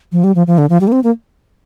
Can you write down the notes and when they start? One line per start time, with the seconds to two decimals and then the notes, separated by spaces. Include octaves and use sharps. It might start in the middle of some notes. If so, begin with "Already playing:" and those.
0.12 F3
0.24 G3
0.35 F3
0.47 F3
0.58 D3
0.70 F3
0.81 G3
0.88 A#3
0.92 C4
1.04 A#3